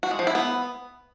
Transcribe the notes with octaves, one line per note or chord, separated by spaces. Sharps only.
F#4
G#3
F3
E4
B3